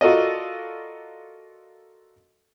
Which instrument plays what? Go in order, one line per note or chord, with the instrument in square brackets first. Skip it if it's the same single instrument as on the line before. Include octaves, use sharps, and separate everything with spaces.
[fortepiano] F4 F#4 A4 A#4 D5 D#5